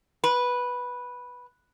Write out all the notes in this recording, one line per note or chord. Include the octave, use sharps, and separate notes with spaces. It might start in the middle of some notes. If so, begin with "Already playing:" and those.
B4